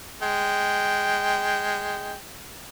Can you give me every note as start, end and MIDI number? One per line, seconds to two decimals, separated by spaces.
0.23 2.15 56
0.23 2.15 79